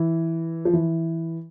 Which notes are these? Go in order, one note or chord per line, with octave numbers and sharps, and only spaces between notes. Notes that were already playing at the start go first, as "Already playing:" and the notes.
Already playing: E3
F3
E3